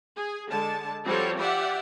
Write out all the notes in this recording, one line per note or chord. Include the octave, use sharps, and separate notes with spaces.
G#4
D3 G#3 A5
F3 G3 C4 F#4 A4 C#5
F4 G4 D5 E5 F#5